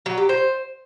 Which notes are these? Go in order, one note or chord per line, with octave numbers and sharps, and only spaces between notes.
F#3
G4
C5